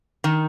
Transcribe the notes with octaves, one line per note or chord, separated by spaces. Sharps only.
D#3